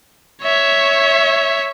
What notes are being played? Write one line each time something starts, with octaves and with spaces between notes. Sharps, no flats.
C#5 E5